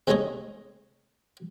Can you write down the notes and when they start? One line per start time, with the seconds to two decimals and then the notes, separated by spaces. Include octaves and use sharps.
0.07 C3 G#3 A3 D#4 C#5 D#5